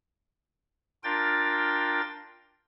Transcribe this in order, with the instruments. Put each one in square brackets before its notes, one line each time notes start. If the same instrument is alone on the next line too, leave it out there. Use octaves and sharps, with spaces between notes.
[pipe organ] D4 F4 A#4 G5 A6